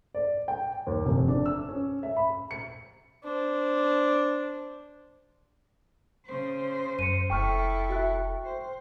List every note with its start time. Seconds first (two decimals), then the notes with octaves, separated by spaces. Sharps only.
0.15 D5
0.48 G5
0.87 D#2
1.06 F1
1.28 D4
1.46 E6
1.69 C#4
2.03 E5
2.17 B5
2.51 C#7
3.23 D4 C5
6.26 C#3 C5
6.99 F#2 C#7 D#7
7.30 F1 E4 A4 G5 C#6 F6
7.90 F#4 E5 F#6
8.45 C5